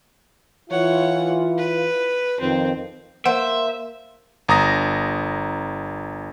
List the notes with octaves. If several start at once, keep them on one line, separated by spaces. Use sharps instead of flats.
E3 E4 F4 C#5 F#5
B4
F2 D#3 C4
A#3 C5 E5 F#5
G1 A#5 D#6 A#6